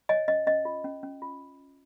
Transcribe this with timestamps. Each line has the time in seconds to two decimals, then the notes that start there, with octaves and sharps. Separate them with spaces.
0.09 C#5 D#5 G#5
0.28 C#4 D#5
0.47 C#4 D#5
0.65 F4
0.84 C#4
1.03 C#4
1.22 F4